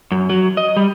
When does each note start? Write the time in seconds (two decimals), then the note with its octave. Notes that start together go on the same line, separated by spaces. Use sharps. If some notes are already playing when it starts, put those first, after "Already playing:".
0.12 F#2
0.30 F#3
0.57 D#5
0.76 G3